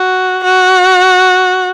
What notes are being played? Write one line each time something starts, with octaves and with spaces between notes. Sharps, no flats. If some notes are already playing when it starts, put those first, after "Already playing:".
Already playing: F#4
F#4